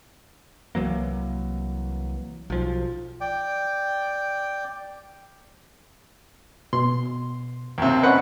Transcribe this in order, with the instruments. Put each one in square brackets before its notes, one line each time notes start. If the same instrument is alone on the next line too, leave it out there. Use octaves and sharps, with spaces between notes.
[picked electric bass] C2 E3 F#3 A#3
B1 F3
[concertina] D5 G5
[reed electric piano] B2 [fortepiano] C6
[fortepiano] D#2 C3
[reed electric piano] C#4 C5 D#5 [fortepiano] B4 F#5